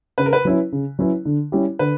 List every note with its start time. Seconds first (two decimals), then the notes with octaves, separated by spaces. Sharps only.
0.18 C#3 B4
0.26 A#4
0.33 B4
0.45 F#3 C#4 E4 B4
0.72 C#3
0.99 F#3 C#4 E4 B4
1.25 D3
1.52 G3 C#4 E4 G4
1.79 D3 B4